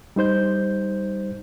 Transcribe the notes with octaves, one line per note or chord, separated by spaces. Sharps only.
G3 D#4 C5 G6